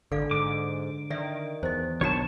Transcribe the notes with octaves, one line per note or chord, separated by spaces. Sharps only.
G#1 D3 A4 D5 F5
G#2 D6
D#3 D5 E5
E2 C5 D#5
B1 D#3 B3 D4 F#4 C#5 A5 B5